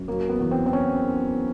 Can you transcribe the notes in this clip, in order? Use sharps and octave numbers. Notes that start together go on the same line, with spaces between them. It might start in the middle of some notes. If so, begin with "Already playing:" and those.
Already playing: F#2
F#3 A#3
B3
E2
C4
C4
C#4